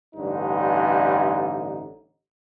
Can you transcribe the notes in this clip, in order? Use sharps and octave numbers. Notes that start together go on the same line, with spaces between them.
A1 G2 D3 D#4